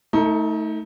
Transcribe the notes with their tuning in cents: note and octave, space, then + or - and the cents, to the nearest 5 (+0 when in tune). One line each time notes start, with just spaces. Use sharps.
A3 +0 D#4 +30 A4 +45